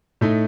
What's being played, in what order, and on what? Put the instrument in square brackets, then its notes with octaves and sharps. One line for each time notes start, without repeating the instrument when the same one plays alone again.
[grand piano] A2 A3 D#4